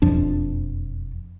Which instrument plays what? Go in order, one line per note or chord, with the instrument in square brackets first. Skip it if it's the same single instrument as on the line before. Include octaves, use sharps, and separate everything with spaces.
[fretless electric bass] E1 F2 F3 D4